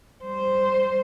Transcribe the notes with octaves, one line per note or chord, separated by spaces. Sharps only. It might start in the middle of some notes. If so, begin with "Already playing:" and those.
G3 C5